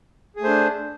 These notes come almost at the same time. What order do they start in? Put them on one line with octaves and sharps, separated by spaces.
G#4 A3 C5 D4